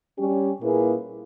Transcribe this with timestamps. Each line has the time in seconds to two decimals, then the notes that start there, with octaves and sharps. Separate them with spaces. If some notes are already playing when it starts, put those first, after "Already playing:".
0.18 G3 C#4 G4
0.61 A#2 A#3 E4 G#4 B4